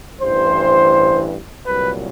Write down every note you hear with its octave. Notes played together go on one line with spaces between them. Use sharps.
A1 G2 E3 C5
C2 A#2 F#3 B4